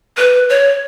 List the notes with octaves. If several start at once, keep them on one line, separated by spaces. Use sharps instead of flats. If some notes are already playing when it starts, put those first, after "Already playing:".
B4
C#5